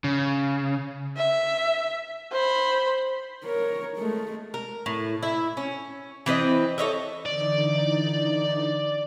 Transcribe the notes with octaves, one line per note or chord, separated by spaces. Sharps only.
C#3
E5
C5 B5
A#4 C#5
G#3 A3
A#4
A2
E4
C#4
E3 C4 B4 D#5
A4 C#5 D#5 E5
D3 E3 D#4 D5